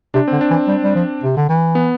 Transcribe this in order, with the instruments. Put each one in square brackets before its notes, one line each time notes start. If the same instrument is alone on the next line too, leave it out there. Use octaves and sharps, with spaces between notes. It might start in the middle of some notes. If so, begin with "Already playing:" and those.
[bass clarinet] C3 [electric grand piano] D4
[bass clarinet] D3 [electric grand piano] C4
[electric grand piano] D4
[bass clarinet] E3
G3
G3
F3
C3
D3
E3
[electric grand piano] B3